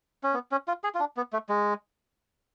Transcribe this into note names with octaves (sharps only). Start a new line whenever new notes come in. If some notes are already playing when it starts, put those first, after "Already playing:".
C#4
B3
C#4
F4
G#4
F4
D4
B3
A3
G#3